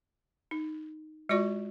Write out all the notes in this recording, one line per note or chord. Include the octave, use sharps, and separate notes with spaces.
D#4
G#3 F4 F#4 D5 C#6